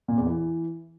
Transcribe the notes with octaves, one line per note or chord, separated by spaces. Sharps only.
A#2
E2
E3